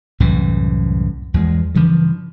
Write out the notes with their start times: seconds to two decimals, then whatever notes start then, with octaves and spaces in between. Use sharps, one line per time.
0.20 C2 F#2 A2 E3
1.34 E2 F3 G#3
1.75 G2 C#3 E3 F3